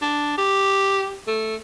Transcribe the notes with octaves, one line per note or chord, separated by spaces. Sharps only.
D4
G4
A3